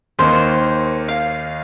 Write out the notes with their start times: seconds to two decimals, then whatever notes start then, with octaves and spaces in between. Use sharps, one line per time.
0.19 D#2 D#3 A#3 D#4 C5
1.08 F5